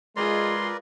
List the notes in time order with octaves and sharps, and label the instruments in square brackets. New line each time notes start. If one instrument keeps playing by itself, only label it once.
[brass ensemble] G#3 [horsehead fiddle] F4 G#4 [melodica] A#4 B4 D5 [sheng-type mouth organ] C6